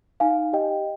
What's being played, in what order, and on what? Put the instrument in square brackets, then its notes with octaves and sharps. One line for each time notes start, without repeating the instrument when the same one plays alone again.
[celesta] D#4 F5 G#5
G4 D#5 G5